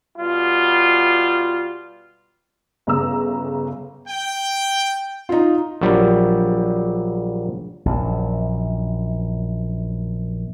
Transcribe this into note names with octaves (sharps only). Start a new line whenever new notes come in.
B2 G3 F4
G1 C#3 A#5 E6
G5
D#4 F4
A#1 F#3 G3
A#1 F#2